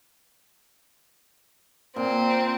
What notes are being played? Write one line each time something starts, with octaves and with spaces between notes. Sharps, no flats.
A#2 C4